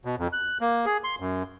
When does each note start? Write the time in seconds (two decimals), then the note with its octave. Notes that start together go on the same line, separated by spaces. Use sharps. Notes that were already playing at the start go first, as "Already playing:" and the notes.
0.05 B2
0.18 F2
0.33 F#6
0.61 A#3
0.86 G#4
1.04 C6
1.20 F#2